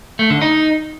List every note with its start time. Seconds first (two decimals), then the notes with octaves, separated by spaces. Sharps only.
0.19 A3
0.30 D3
0.42 D#4